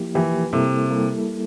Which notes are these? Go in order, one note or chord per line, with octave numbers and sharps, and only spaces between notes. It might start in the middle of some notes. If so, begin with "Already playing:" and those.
Already playing: F3 A#3 E4 G4
E3 F3 A#3 E4 G4
C3 G3 A#3 E4 A4
G3 A#3 E4 A4